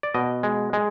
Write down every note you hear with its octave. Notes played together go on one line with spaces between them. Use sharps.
D5
B2 D#5
G#3
G#3